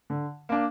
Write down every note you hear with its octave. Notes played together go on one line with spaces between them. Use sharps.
D3
A#3 D4